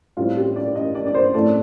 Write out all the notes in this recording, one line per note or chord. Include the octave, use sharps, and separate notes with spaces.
A2 G3 C4 F4
G4
D5
D#5
D5
D5
C5
A2 A3 C4 D5